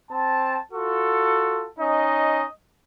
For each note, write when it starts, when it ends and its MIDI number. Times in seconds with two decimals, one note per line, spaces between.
0.11 0.60 60
0.11 0.60 81
0.72 1.66 65
0.72 1.66 66
0.72 1.66 69
1.79 2.45 61
1.79 2.45 63
1.79 2.45 75